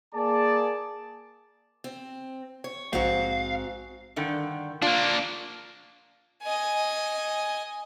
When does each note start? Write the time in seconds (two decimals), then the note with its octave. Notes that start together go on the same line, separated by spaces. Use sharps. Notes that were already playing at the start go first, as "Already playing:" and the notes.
0.15 A#3 G#4 D5 A5
1.84 C4
2.64 C#5
2.93 A#1 G#2 C4 F#4 F5
4.16 G2 D3 D#3
4.82 A#3 D4 F4
6.43 D#5 G#5